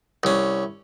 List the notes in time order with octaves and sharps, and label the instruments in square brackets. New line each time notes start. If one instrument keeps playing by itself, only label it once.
[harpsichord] C2 C#4